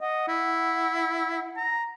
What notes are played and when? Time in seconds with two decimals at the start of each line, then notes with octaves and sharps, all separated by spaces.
0.01 D#5 F#5
0.28 E4
1.57 A#5